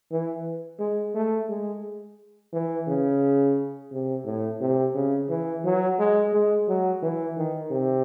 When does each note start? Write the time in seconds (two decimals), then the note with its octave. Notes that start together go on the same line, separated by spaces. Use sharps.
0.12 E3
0.80 G#3
1.15 A3
1.49 G#3
2.53 E3
2.87 C#3
3.91 C3
4.25 A2
4.61 C3
4.95 C#3
5.29 E3
5.64 F#3
5.99 G#3
6.33 G#3
6.68 F#3
7.03 E3
7.37 D#3
7.71 C3